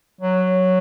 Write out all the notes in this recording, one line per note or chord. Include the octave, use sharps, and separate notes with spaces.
F#3